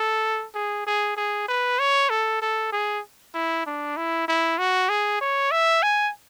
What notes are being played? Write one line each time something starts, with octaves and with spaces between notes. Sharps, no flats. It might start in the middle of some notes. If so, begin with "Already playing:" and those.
Already playing: A4
G#4
G#4
G#4
B4
C#5
A4
A4
G#4
E4
D4
E4
E4
F#4
G#4
C#5
E5
G#5